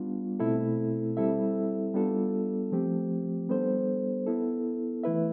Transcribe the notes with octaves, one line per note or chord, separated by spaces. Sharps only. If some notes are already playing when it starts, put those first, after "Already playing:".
Already playing: G3 B3 D4 F4
B2 A3 C4 E4 A4
G3 C4 E4 A4 E5
G3 B3 D4 F4 A4
F3 A3 C4 G4
G3 B3 D4 A4 C5
B3 E4 A4
E3 A3 E4 B4 E5